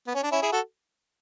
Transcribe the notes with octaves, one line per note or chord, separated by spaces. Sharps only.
B3
C#4
D4
C#4 E4
E4 G#4
F#4 A4